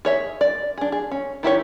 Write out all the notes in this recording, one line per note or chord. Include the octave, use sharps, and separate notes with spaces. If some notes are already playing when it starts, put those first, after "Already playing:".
G#4 C#5 E5
D5
D4 G#4
G#4
C#4
D#3 E4 G4 C#5